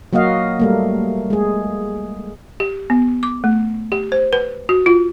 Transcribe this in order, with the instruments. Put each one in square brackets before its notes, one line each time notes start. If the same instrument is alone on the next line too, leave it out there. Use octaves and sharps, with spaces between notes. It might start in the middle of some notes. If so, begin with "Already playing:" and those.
[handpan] F#3 A#3 F#4 D#5 F5
G3 A3 A#3
G#3 G#4
[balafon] G4
B3
D6
A3
G4
C5
B4
F#4
F4